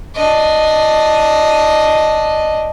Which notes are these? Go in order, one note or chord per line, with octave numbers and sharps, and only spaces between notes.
D4 D#5